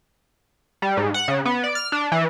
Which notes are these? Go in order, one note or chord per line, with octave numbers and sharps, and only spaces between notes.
G3
G#2
F#5
C#3
B3
D5
F6
D4
E3